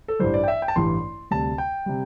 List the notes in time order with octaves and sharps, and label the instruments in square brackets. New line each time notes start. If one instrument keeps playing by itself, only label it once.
[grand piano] A4
A1 G2 E3 G3 C5
D5
G5
E5
G5
A5
A1 G2 E3 G3 C6
D2 C3 G3 A5
G5
C3 G3